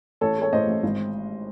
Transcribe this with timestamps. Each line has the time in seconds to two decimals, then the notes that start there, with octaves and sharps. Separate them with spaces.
0.21 A1 A4 C#5
0.38 G#3 A4 C#5
0.53 A2 C5 D#5
0.67 A1
0.83 G#1